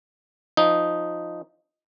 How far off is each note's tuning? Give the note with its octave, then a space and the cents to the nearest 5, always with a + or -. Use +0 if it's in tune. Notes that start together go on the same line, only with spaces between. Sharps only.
F3 +0 D#4 +0